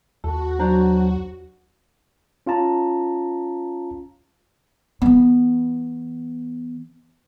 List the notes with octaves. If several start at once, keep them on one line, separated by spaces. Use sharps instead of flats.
D#2 F#4 A4
F#3 D4 C5 A#5
C#4 F4 F5 A5 A#5
E3 B3